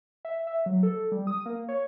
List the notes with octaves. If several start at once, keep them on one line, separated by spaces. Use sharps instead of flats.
E5
E5
F#3
A4
G3
D#6
A#3
C#5